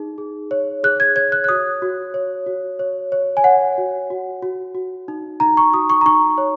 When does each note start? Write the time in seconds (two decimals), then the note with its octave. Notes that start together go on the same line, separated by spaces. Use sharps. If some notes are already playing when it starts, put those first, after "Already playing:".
Already playing: D#4 G#4
0.18 G#4
0.51 C#5
0.84 G#4 F#6
1.00 G#6
1.16 C#5 G#6
1.32 F#6
1.44 F#6
1.49 F#4 D#6
1.82 F#4
2.14 C#5
2.46 F#4
2.79 C#5
3.12 C#5
3.37 G#5
3.44 C#5 F#5
3.78 F#4
4.10 F#4
4.42 F#4
4.75 F#4
5.08 D#4
5.40 D#4 A#5
5.57 C#6
5.73 F#4 D#6
5.90 C#6
6.01 A#5
6.06 D#4 C#6
6.38 C#5